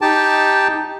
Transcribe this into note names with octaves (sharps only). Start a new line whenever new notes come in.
D#4 G4 G5 A5